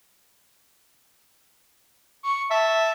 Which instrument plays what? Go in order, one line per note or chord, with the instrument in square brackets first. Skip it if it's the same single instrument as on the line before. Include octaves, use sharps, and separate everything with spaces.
[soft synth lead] C#6
[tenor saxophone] E5 [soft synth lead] A5